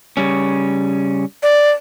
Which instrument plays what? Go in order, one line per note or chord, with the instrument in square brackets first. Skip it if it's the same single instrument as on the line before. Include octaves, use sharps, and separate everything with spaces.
[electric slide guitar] C#3 G3 C#4
[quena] D5